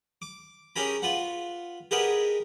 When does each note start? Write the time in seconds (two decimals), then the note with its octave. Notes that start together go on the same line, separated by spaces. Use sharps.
0.22 D6
0.76 C#4 G4 G#4 A#4 G#5 B5
1.02 F4 B4 F#5
1.91 G4 G#4 A#4 B4 D#5 F#5